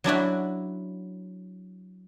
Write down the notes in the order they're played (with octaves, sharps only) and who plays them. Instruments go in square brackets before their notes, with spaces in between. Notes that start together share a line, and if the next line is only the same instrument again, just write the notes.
[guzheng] F#3 D4 E4 F#4